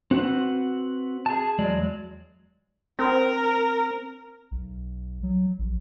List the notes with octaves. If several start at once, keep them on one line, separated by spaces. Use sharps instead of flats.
C4 F#4 B4 F#5
G#4 A5
E2 F#3 G#3 D5
C4 A#4
B1
F#3
A#1